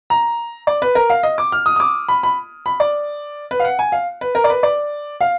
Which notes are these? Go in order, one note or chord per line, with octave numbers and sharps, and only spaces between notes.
A#5
D5
B4
A#4
F5
D#5
D6
F6
D#6
D#6
D6
B5
B5
B5
D5
B4
F5
F#5
G#5
F5
B4
A#4
D5
B4
D5
F5